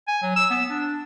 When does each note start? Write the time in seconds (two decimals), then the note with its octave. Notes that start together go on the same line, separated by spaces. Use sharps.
0.08 G#5
0.23 F#3
0.36 E6
0.50 B3
0.70 D4